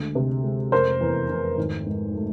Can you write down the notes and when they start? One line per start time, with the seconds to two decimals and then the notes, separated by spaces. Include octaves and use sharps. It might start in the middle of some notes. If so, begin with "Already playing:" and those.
Already playing: D2 G#3
0.15 C3
0.44 G#3
0.72 F1 A#4 C5
1.01 E2
1.29 F1
1.57 G#1
1.86 G#2
2.15 A3